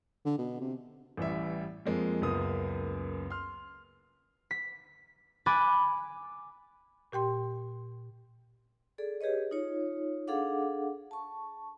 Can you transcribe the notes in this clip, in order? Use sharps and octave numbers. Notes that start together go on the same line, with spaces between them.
D3
B2
C3
A1 E3 G3 E5
F2 F3 G#3 A#3
C#2 F#2 A#3 B3 D#6
C6 F6
B6
G#5 B5 D6 F#6 A6
A#2 G4 G5 C6
G#4 A4 D5
G4 G#4 B4 C#5 D#5
D#4 F4 C#5
D4 G#4 A4 F5 F#5 D6
A5 C#6